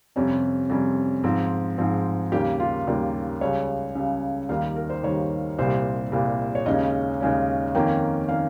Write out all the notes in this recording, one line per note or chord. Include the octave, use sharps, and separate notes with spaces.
F2 C3 G3 C#4 C#5
F2 C3 G3 C#4
G#2 F3 C4
G#2 F3 C4
D#2 C#3 G3 A#3 G4
F4
D#2 C#3 G3 A#3 G4
C#2 C#3 G3 C#5
C#2 C#3 G3
D#2 D#3 G3 F5
A#4
C5
D#2 D#3 G3 C#5
C2 A#2 G3 C5
C2 A#2 G3
C#5
D#2 C#3 G#3 C#4 D#5
D#2 C#3 G#3 C#4
F2 D#3 A#3 C#4 G5
D#3 A#3 C#4 F5